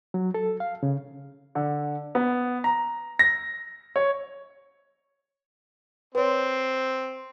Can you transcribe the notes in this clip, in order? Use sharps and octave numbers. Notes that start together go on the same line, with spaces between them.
F#3
A4
F5
C#3
D3
B3
A#5
A#6
C#5
C4 B4 C#5